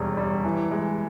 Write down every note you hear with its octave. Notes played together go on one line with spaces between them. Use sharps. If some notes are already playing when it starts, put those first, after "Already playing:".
Already playing: E1 D#2 G3
G3
E3
G#3